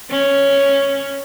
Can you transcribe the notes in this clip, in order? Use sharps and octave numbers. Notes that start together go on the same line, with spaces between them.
C#4